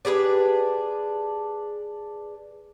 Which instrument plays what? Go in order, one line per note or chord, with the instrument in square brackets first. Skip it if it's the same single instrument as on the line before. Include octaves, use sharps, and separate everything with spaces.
[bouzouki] D4 G4 G#4 B4